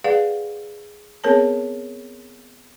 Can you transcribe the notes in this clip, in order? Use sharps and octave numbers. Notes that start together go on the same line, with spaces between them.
G#4 B4 D5 F5 F#5
B3 C4 G#4 A#4 C#5 A5